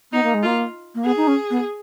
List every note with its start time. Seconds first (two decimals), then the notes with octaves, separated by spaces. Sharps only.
0.12 B3 D#4
0.23 A#3
0.34 G#3
0.43 A#3 F4
0.94 A#3
1.04 B3 G#4
1.17 D#4
1.27 C#4
1.50 B3